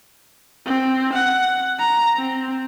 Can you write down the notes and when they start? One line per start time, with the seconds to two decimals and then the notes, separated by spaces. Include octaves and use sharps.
0.66 C4
1.13 F#5
1.79 A#5
2.18 C4